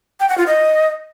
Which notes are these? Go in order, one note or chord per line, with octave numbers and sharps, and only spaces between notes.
G5
F#5
F4
D#5